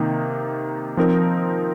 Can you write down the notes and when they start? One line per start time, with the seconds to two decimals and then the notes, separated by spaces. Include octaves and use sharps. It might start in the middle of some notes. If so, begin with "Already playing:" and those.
Already playing: C3 D#3 A#3 D#4
0.97 F3 C4 D#4 A#4